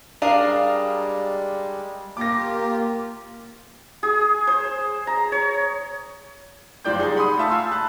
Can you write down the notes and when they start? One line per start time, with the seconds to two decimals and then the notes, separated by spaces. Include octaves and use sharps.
0.22 G3 G#3 D4 A#4 F5 D#6
2.17 A#3 F4 G4 D6 A#6
4.03 G#4
4.47 C5
5.07 A#5
5.32 C#5
6.85 F#1 F3 C5 D5 G5 G6
7.00 G3 D#4 G#4
7.16 F#5 B5 C6 D#6
7.37 A3 F4 E5 A5
7.50 F5 G#5 A5 C6 E6
7.72 A5 B5 F#6